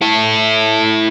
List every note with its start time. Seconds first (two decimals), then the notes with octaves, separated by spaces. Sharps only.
0.01 E4 A4